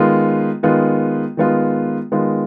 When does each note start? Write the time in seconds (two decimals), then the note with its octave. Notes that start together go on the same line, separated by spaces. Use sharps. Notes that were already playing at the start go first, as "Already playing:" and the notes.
Already playing: D#3 G#3 B3 F4
0.63 D#3 G#3 B3 F4
1.37 D#3 G#3 B3 F4
2.12 D#3 G#3 B3 F4